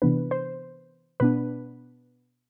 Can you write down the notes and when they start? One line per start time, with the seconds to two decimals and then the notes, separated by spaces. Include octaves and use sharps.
0.02 C3 E3 B3 D4 B4
0.31 C5
1.20 B2 B3 D4 B4